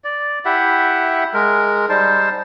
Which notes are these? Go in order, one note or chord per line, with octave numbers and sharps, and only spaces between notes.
D5
E4 G4 E5 F#5
G#3 A#4
G3 D#4 C5 A5